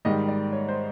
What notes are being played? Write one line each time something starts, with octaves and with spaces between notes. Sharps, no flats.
G#2 D#3 G3 D#5
D5
C#5
C5